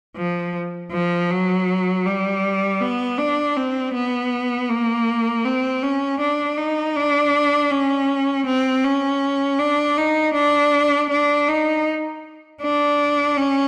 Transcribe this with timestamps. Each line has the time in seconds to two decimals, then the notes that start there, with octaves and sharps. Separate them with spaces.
0.17 F3
0.92 F3
1.31 F#3
2.06 G3
2.81 B3
3.19 D4
3.57 C4
3.95 B3
4.70 A#3
5.45 C4
5.83 C#4
6.21 D4
6.58 D#4
6.96 D4
7.72 C#4
8.47 C4
8.85 C#4
9.60 D4
9.98 D#4
10.35 D4
11.11 D4
11.49 D#4
12.62 D4
13.37 C#4